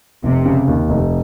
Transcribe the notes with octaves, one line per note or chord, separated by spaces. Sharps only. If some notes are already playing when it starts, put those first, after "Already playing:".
F1 C3
C#3
D#2
F1